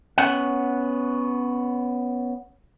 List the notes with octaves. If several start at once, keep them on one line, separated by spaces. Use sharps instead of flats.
B3 C#4 F#5